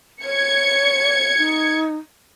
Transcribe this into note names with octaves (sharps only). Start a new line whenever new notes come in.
C#5 G#6 C#7
D#4